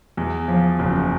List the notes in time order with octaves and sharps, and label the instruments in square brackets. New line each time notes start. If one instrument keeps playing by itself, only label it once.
[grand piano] E2
F3
F#1